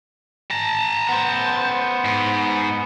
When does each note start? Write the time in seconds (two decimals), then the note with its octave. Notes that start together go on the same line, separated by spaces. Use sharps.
0.50 A5 A#5
1.09 B3 C5
2.05 G#2